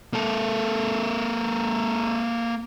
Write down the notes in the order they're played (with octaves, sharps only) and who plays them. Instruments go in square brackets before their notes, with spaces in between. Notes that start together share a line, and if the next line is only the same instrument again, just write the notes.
[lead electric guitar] A#3 A4